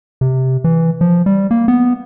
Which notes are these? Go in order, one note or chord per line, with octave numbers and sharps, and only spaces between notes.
C3
E3
F3
G3
A#3
B3